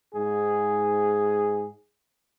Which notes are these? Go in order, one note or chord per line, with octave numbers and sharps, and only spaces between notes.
G#2 G#4